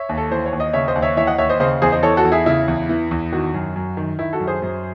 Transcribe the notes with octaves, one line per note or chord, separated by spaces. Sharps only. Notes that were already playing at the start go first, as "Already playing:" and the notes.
Already playing: C#5 E5
D#2
A4
E3 C5
C#5
D#2
D#5
C#3 C#5 E5
C5 D#5
D#2
C#5 E5
E3 C#5 E5
D#5 F#5
D#2 C#5 E5
C5 D#5
C#3 C5 D#5
E2 G#4 C5
C5 D#5
E3 A4 C#5
F#4 A4
E2
E4 G#4
C#3 E4
E2
E3
E2
D#3 F#4
F#2
F#2
D#3
D#3 E4
F#4 A4
F#2
G#4 C5
F#2